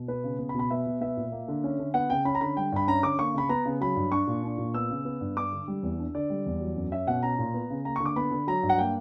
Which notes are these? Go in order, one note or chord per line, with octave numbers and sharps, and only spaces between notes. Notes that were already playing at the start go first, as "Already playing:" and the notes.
Already playing: B2
B3 B4
C#3
B3
B5
B2
B5
B3 E5
B2
B3 E5
A#2
A#3
D3
C#4
D3
B3 F#5
C#3 G5
C#4 B5
A#5
D3 B5
G3 G5
G2 B5
C#4 A#5
D3 D6
A#3 C#6
C#3 B5
B3 A#5
C#3
F#3 B5
G2
D4 C#6
A#2
D4
A#2
B3 E6
C#3
B3
G2
D4 D6
D3
G3
E2
D4
D3 D5
G3
E2
F#3
F#2
C#4 E5
B2 F#5
C#4 A#5
A#2
B3
C#3
A#3 A#5
C#6
D3
D6
B3 B5
D3
F#3 A#5
G2
F#5
A#3 G5